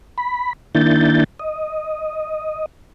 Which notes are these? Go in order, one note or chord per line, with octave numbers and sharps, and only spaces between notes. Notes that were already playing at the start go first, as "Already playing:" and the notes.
B5
D#3 A#3 D4 E4 G6 A6
D#5